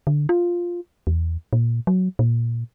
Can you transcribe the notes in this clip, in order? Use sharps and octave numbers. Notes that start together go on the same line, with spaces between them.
D3
F4
E2
A#2
F#3
A#2